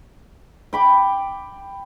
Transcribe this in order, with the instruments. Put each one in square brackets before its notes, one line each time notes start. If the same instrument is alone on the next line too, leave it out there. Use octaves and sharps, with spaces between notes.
[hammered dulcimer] G5 B5 D6